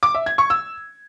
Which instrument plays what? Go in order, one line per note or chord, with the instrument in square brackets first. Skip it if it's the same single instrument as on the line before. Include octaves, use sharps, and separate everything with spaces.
[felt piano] D6
E5
G#6
C#6
E6